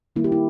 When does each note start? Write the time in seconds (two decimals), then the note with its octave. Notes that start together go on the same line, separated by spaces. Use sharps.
0.16 D#3 G3 A#3 E4
0.24 G4
0.32 E4